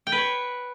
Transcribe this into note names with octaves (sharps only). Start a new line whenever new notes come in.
G5
B4
C#5